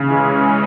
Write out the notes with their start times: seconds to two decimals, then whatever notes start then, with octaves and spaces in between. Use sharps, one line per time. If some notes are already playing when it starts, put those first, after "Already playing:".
Already playing: C#3
0.08 E3 G#3 C#4